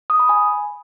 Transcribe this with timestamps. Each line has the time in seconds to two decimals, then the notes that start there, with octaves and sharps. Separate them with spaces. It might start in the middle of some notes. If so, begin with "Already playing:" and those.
0.10 D#6
0.19 B5
0.29 G#5